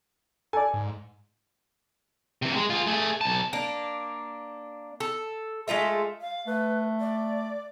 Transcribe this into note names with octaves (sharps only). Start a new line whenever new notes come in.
A4 D5 G#5
G#2
C3 E3
G#3
F4 G#4
A3 G#4
B1 A5
A#3 D4
A4
G#3 A3 F4 E5
F5
A3 B4
D5